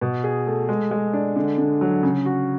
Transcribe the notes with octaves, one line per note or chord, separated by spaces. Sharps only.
B2
G#4
A3
G#3
G#3
D4
D3
D3
F#3
C#3
F#4